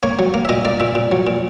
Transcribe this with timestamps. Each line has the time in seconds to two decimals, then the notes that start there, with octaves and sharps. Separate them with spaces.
0.03 A#3 C#5
0.19 F#3
0.34 A#3
0.45 E5
0.49 A#2 D#5
0.65 A#3 D5
0.80 A#2 E5
0.95 A#2
1.12 F#3
1.27 A#2